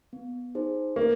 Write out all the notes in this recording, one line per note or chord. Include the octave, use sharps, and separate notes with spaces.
B3
D#4 G#4 C5
A#3 C#4